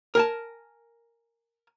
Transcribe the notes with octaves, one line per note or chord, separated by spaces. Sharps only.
A#4 G#5 A5